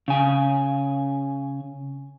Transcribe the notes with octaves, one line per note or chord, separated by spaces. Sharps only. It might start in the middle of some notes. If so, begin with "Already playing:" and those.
C#3 G#5